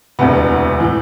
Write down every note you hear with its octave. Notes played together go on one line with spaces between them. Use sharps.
E1 D2 C3 B3
A2 E3